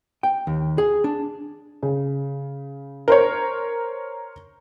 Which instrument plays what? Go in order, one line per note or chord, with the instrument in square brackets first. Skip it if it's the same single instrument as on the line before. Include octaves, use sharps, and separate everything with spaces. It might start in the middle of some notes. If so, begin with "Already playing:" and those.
[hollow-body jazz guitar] G5
D#2
G#4
D4
[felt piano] C#3
A#4 C5 C#5